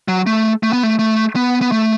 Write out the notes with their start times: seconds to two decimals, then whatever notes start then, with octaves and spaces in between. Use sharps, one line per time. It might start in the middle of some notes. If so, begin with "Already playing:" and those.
0.08 F#3
0.27 A3
0.63 A3
0.73 B3
0.83 A3
0.99 A3
1.36 B3
1.61 B3
1.72 A3